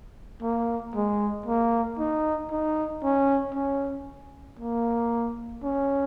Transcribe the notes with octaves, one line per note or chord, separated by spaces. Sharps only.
A#3
G#3
A#3
D#4
D#4
C#4
C#4
A#3
C#4